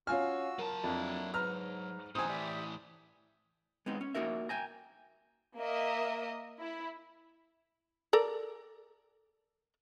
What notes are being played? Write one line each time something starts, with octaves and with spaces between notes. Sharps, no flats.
C#4 F4 F#4 F5 G#5 E6 F6
F#3 A#4 A5
F2 A#3 D4 E4
G#2 B4 A#5 F6
A2 E3 F#3 C4 D#4 C5 G#5 D#6
G4 D5 E5
G#3 B3 C4 D#4
C#4
A#3 D#4 F#4 A#4 E5
G5 G#5 A#5
A#3 A#4 D#5 E5
E4
A4 A#4 D5